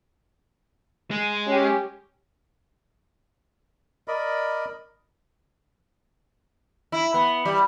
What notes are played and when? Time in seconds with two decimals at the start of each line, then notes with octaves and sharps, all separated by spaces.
1.11 G#3
1.47 C#4 G4
4.08 A#4 D5 D#5 B5
6.92 E4
7.14 B3
7.45 G3